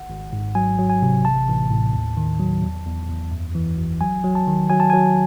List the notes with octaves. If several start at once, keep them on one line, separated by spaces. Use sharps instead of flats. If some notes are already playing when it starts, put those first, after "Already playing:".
Already playing: G#1 F#5
G#1
G#2
F#3 G#5
F#3
G#5
C3
A1 A5
A1
A2
D#2
D#3
F#3
E2
E2
E2
F#2
E3
G#1
F#3 G#5
F#3
A5
D#3
F#3 G#5
A5
F#3 G#5